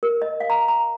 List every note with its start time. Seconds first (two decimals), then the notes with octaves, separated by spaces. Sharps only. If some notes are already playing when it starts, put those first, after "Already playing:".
0.03 A#4
0.22 D#5
0.40 F5
0.50 A#5
0.68 A#5